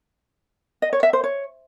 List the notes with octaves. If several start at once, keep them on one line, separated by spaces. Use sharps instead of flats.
D#5
C#5
E5
C5
C#5